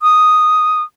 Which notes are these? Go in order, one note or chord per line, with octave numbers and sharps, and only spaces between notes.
D#6